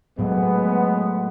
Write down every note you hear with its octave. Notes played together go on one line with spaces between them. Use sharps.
A2 F#3 G#3 A3 B3